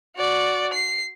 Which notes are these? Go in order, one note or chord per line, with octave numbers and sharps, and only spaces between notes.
F#4 D5
C7